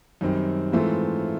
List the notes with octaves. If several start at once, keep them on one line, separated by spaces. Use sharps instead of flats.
F#2 D#3 G3 C4
G#2 E3 A3 C4 F4